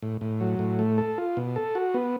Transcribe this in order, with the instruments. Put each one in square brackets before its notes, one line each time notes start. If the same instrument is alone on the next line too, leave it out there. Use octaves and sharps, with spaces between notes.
[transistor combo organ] A2
A2
F#3
A2
A3
A4
F4
B2
A4
F#4
B3